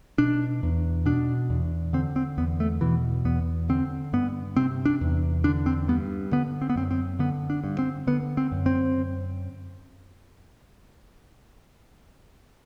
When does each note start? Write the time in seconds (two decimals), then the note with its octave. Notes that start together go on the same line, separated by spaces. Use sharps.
0.18 B2 D4
0.63 E2
1.06 B2 D4
1.50 E2
1.93 D3 C4
2.16 C4
2.38 E2 B3
2.60 A3
2.81 B2 E3
3.25 E2 B3
3.69 D3 C4
4.13 G2 B3
4.57 C3 C4
4.86 D4
5.01 E2
5.44 D3 D4
5.66 C4
5.88 G2 B3
6.32 D3 B3
6.62 C4
6.70 B3
6.76 F#2 C4
6.91 C4
7.19 D3 B3
7.50 D4
7.64 G2
7.79 C4
8.07 D3 B3
8.37 C4
8.52 F#2
8.66 C4